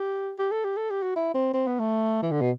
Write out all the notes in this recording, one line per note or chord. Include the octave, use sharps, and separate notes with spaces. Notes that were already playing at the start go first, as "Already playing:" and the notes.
Already playing: G4
G4
A4
G4
A4
G4
F#4
E4
C4
C4
B3
A3
E3
D3
B2